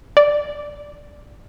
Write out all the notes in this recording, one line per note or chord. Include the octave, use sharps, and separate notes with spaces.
D5